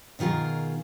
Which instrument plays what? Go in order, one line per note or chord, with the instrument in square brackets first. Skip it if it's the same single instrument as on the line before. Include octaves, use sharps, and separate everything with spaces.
[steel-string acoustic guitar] B2 D#3 F4 G#4 A#4